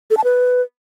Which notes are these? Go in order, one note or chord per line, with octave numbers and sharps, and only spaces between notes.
A4
A5
B4